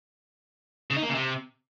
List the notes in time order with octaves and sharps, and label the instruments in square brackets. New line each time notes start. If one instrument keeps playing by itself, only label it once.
[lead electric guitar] C#3
D#4
A#3
C#3
C3